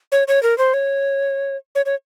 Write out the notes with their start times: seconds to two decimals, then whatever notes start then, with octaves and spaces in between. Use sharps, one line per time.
0.12 C#5
0.28 C#5
0.43 A#4
0.58 C5
0.74 C#5
1.75 C#5
1.86 C#5